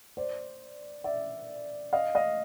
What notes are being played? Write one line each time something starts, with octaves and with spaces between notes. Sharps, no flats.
C5 D5
D5 E5
D#5 F5
D#5 F5